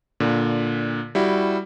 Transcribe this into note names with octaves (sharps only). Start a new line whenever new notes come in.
A#2 D3
G3 E4 F#4